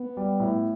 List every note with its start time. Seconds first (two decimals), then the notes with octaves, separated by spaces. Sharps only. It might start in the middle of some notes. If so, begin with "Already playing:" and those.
Already playing: B3
0.17 G3
0.40 A2